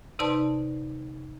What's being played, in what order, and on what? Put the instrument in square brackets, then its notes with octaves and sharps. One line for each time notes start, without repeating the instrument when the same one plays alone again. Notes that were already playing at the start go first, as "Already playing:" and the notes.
[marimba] C3 D#4 B4 D5 A5 C6